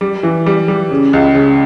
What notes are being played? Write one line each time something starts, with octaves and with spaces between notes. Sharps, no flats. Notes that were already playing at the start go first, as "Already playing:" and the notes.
G3
E3
G3
G3
C#3
C#2
C#3